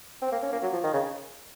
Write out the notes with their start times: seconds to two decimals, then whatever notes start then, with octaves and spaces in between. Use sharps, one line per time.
0.22 C4
0.32 A#3
0.42 C#4
0.52 A#3
0.62 F#3
0.73 F3
0.83 D#3
0.93 C#3